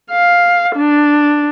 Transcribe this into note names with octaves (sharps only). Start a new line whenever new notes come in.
F5
D4